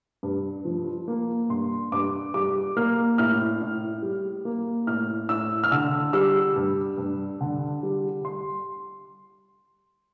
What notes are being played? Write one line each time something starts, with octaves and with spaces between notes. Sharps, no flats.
G2
F3
A#3
G2 C6
G2 D6
G3 D6
A#3 F6
A2 F6
A2
G3
A#3
A2 F6
A2 E6
F6
D3 E6
G3 E6
G2
G2
D3
G3
C6